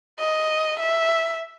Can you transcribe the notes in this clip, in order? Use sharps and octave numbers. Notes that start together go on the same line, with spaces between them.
D#5
E5